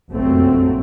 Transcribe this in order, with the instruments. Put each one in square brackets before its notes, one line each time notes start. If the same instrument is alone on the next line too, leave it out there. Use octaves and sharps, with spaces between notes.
[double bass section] F1 A#1 F#2 F#3 A3 C4